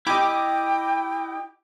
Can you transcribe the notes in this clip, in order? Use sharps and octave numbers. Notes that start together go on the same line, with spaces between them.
E4 G4 D#5 G5 D6